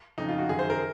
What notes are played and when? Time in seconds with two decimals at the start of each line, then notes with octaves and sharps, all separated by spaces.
0.18 F2 C#3 D#4
0.29 F4
0.38 F#4
0.49 F#2 D#3 G#4
0.59 C5
0.70 A#4